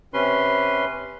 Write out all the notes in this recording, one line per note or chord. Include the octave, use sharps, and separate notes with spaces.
C3 C#4 B4 C6